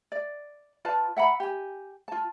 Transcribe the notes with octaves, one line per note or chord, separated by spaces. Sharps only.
D5
F4 B4 D5 A5
E5 F#5 A#5 B5
G4 G#5
F4 A5